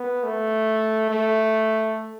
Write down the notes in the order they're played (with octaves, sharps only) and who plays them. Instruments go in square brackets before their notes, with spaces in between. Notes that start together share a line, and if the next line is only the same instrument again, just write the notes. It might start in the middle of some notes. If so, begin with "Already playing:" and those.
Already playing: [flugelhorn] B3
A3
A3